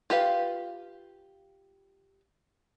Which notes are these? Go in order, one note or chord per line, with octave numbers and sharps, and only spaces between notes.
F4 G4 B4 F5